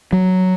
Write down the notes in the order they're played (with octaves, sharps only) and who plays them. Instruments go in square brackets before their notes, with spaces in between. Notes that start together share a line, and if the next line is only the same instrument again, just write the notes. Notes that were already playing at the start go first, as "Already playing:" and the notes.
[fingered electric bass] F#3